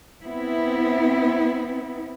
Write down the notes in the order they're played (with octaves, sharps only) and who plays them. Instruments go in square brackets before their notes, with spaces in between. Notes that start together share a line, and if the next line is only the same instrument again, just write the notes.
[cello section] B3 C4 E4